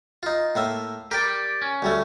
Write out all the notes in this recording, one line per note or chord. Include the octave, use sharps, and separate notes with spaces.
D#4 F4
A2 A#3 E5
G4 A#4 D5 G5
C#4
D2 G3 A3